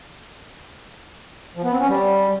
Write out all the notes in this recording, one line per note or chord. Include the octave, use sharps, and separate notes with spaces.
F3
B3
C4
C#4
G3